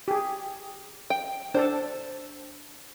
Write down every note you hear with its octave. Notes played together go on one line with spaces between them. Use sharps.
G4 G#4
G5
D4 A4 C5 A5